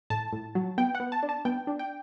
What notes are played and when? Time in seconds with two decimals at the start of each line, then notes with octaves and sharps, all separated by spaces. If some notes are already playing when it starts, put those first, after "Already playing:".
0.10 A2 A5
0.33 A2
0.55 F#3
0.78 B3 G5
0.95 F#5
1.00 B3
1.12 A5
1.23 D4
1.29 A5
1.45 B3 G5
1.67 D4
1.79 G5